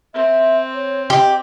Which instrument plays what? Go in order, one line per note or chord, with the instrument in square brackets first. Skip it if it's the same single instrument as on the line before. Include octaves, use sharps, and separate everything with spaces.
[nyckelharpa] C4 [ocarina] E5
[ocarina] C#5
[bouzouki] G4 [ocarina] D#5